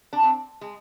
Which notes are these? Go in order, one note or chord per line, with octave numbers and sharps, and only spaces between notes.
D4
C4
G#3